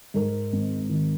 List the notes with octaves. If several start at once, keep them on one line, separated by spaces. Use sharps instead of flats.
G#2 A#4
G#1
D#3